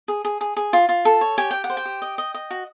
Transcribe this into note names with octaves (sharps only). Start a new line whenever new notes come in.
G#4
G#4
G#4
G#4
F4
F4
A4
C#5
G4 G#5
G4 G5
F#5
C5
G5
G4
D#5
D#5
D#5
F#4